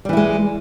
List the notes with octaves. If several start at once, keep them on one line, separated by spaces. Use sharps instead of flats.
E3 G3 G#3 E4